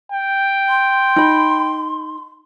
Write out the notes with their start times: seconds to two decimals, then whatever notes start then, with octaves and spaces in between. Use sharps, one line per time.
0.12 G5
0.69 C6
1.16 D#4 B5